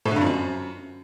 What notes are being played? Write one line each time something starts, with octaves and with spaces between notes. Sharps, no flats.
A2
D3
G2
F2
F#2